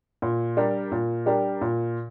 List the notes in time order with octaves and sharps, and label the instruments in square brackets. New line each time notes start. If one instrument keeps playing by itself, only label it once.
[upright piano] A#2
G3 D4 G4 A#4
A#2
G3 D4 G4 A#4
A#2